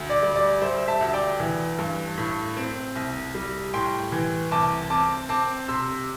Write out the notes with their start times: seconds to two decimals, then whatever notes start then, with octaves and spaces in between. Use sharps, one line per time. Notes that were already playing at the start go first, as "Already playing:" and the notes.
Already playing: D2
0.10 D5
0.23 G3
0.36 D5
0.62 G3 C5 E5
0.88 E5 A5
1.01 D2
1.13 D5 G5
1.40 E3
1.79 G2
2.18 A2
2.57 C4
2.96 C2
3.35 G3
3.74 A2 G5 C6
4.12 E3
4.51 C2 A5 D6
4.90 C4 A5 D6
5.29 C4 A5 D6
5.68 C3 C6 E6